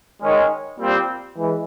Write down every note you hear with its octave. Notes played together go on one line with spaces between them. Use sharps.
D#3 G#3 C#4
A#2 G3 C4
E3 G#3